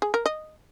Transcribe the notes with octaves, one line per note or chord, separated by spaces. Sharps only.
G#4
A#4
D#5